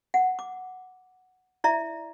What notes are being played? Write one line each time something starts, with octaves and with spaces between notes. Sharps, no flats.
F#5
D6
E4 D5 E5 A#5